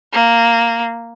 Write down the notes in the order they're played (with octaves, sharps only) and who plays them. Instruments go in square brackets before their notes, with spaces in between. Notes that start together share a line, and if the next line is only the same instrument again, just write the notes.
[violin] A#3